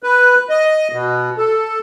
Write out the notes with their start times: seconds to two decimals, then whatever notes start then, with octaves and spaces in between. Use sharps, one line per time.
0.03 B4
0.49 D#5
0.92 B2
1.37 A4